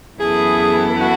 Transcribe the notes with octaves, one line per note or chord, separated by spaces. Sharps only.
F#2 E3 B3 E4 G#4 A4
F#4